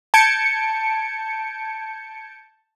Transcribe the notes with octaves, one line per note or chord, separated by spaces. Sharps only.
A5 G6 G#6 C#7 D7